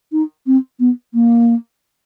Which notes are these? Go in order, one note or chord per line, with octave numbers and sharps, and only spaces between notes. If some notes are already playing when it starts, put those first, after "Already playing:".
D#4
C4
B3
A#3